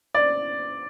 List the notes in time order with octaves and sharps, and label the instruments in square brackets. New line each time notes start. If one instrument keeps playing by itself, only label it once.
[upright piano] D5